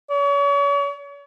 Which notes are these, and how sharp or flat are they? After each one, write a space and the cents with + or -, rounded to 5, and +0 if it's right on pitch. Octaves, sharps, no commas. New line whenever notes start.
C#5 +40